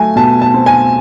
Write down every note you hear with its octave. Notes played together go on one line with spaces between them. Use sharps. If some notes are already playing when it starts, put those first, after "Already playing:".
Already playing: F#3 A3 G#5
B2 A5
A5
C4
G#5